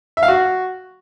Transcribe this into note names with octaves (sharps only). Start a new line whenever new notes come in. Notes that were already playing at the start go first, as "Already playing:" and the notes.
E5
F5
F#4